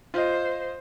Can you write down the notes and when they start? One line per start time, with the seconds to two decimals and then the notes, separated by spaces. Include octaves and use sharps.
0.14 F4 C5 D#5